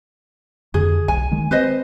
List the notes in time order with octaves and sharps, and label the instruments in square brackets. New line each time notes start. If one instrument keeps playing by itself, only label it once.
[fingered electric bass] F2 D3 [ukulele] G#4
[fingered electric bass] B1 [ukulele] G#5
[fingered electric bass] D#3 G#3
[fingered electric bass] C4 [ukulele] B4 C5 D#5